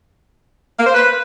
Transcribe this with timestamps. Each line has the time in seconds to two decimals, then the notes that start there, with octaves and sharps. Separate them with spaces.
0.78 A#3
0.86 C5
0.94 B4